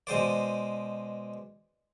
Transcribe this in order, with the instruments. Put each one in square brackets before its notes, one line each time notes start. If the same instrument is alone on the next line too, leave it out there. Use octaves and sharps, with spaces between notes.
[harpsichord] B2 G#3 C5 D5